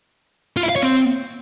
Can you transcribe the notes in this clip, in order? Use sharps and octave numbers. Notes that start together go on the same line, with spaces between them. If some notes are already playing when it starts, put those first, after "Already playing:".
F4
E4
F5
C#5
C4